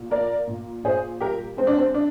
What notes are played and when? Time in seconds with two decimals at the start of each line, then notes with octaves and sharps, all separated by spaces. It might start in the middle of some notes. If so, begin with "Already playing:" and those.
Already playing: A#2
0.10 A#3 A#4 D5
0.47 A#2
0.84 A#2 G#4 C5
1.20 G3 G4 A#4
1.57 G#3 C4
1.67 D4
1.77 C4
1.94 D4